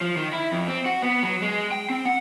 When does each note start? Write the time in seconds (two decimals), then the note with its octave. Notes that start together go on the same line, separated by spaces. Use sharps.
0.01 F3
0.17 D#3
0.33 E4
0.52 F2
0.68 C4
0.86 F#4
1.02 B3
1.23 F#3
1.42 G#3
1.71 G5
1.90 C4
2.06 F#5